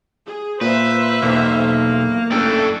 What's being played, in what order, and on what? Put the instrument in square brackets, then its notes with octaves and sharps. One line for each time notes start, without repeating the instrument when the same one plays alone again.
[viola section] G#4
[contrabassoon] A#2 [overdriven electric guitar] B4 [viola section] C5 E5
[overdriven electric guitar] B1 [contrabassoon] E2 [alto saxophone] A#3
[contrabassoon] F#1 [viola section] A3 D4 E4 [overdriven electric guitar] A4 G5